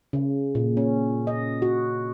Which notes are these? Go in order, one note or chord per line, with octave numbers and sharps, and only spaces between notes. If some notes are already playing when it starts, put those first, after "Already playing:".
C#3
A#2
C#4
D#5
F#4